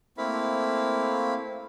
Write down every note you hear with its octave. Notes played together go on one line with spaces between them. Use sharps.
A3 A#3 C4 E4 F5 B5